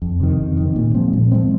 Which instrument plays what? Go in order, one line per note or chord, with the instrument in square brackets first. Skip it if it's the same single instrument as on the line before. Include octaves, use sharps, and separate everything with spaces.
[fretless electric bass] F2
C3 D#3
F2
C3 D#3
A#2
F3 G#3 C4
A#2
F3 G#3 C4